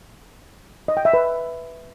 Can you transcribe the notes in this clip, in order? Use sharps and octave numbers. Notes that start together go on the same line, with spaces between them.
D#5
G5
E5
B4